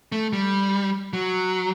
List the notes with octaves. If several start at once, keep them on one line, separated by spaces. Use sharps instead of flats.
A3
G3
F#3